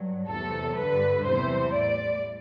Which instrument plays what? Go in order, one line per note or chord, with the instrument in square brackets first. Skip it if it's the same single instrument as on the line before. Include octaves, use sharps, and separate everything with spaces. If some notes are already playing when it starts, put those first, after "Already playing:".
Already playing: [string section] G2 F#3
E2 C3 F#3 A3 A4
G2 D3 G3 B4
E2 C3 E3 G3 C5
A2 G3 D5